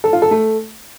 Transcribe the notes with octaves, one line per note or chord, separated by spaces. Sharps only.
A4
F4
A4
A3